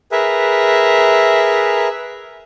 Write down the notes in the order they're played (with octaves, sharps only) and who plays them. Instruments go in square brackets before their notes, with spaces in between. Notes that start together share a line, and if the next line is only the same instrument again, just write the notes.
[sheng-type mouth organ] G#4 A#4 B4 E5